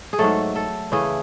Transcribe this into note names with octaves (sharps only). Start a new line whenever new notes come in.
G#4
G#2 F#3 A3 A4
A4
C#3 E3 A3 G#4